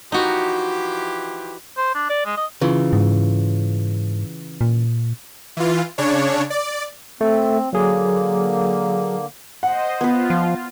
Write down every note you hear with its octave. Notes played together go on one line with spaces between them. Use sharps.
E3 F3 D#4 F#4 G4
C5
D4
D5
G#3
D#5
C#3 E3 F4
G#2
A#2
E3 F4
C#3 D4 C#5
D5
A3 C4
D3 F#3 A#3 G#4
C5 D#5 F#5
B3 F4 B4
F3